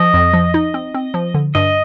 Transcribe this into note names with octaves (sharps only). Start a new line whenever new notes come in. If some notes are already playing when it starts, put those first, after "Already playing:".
Already playing: F3 D#5
F2
F3
D#4
C4
C4
F3
D3
G2 D#5